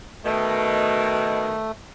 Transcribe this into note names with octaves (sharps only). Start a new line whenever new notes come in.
B2 D#3 A3